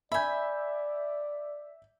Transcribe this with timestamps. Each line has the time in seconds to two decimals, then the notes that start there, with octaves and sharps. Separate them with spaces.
0.12 D5 E5 G#5 B5 G6